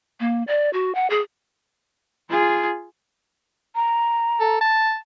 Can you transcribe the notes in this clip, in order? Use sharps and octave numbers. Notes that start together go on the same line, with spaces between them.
A#3
D5
F#4
F#5
G#4
F4 G#4
A#5
A4
A5